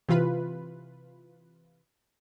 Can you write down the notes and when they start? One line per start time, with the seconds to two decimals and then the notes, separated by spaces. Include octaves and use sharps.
0.09 C3 E3 F4 B4